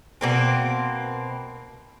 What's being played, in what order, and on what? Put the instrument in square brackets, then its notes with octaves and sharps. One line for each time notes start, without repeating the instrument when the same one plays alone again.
[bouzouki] B2 A#3 C4